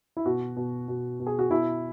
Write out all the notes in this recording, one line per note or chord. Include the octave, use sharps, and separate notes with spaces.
E4
B2 F#4
B2
B2
B2
G#4
F#4
B2 E4